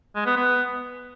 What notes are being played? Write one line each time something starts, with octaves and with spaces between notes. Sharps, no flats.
G#3
B3
B3